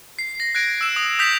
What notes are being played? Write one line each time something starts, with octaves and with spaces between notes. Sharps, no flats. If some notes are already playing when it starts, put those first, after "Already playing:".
C7
A#6
F#6 G#6 A#6 D7
E6 E7
D#6
D#6 G6 B6 F7